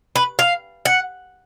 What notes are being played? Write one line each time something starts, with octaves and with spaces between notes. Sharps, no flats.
B4
F5
F#5